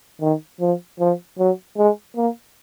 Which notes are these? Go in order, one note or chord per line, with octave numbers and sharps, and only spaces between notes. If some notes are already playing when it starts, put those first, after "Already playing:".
D#3
F3
F3
F#3
G#3
A#3